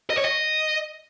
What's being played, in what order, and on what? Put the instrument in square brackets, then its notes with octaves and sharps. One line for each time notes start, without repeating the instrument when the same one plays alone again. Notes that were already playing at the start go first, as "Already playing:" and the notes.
[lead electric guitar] D#5
C#5
D#5